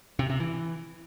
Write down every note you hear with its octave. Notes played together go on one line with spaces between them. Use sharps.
C3
C3
E3